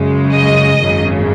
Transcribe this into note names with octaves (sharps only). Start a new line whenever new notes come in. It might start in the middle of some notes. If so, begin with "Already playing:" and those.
Already playing: F#2 C#3 G#3
D#5
G#1 F#2 C#3